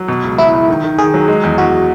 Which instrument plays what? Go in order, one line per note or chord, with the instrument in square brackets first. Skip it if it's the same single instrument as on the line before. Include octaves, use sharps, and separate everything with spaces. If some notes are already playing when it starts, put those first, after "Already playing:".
Already playing: [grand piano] F#3
B2
C#2
[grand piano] F#3 [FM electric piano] E4
[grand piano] C#2
D#3
D#3
[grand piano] D#3 [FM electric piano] G#4
[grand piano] F#3
G#3
E2
[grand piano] E2 [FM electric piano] F#4